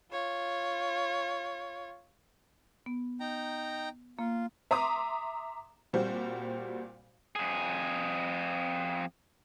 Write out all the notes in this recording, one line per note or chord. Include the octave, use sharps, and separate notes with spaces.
F4 C#5
B3
D#4 G5 A#5
A#3 F4
E5 A#5 C6 D6 D#6
A#2 G3 C4 F#4 C5
F2 G#4